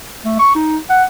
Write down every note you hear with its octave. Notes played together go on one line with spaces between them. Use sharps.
A3
C#6
D#4
F#5